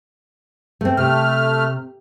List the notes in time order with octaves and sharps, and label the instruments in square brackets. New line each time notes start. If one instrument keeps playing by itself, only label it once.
[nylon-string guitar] A3 C4
[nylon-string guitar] C3 [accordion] A3 F6